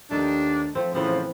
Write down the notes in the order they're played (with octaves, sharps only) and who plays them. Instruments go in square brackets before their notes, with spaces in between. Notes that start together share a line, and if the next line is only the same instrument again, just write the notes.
[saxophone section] D#2 D4 [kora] A3 D#4 D5
[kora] F3 A3 C4
[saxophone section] A2 C#3 F3 [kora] E3 B3 C4